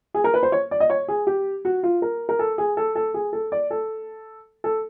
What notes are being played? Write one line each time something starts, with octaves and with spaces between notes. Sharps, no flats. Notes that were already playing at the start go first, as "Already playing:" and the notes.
G#4
A#4
B4
C5
C#5
D5
D#5
C#5
G#4
G4
F#4
F4
A#4
A#4
A4
G#4
A4
A4
G#4
A4
D5
A4
A4